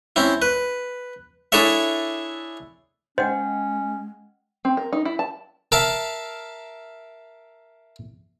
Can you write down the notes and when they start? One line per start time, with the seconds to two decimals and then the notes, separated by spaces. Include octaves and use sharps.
0.16 C4 C#4 E4
0.42 B4
1.52 D4 E4 G#4 A4 C#5 E5
3.18 G#3 C#4 C5 D#5 F#5 G5
4.65 C4
4.77 A#4
4.93 D#4
5.05 E4
5.19 A5
5.72 A#4 E5 F5 A5